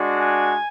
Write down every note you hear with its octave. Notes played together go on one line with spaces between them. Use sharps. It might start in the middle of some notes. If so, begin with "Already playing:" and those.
Already playing: G#3 D4 F#4
G#5